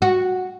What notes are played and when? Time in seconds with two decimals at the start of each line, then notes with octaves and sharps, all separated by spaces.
0.02 F#4